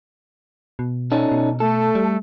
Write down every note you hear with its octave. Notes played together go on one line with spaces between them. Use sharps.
B2
C#4 D#4 A4
B2
A3 A4
G3